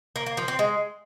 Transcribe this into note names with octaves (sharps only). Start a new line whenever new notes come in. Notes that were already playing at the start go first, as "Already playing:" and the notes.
A#3
A#3
F3
C4
G#3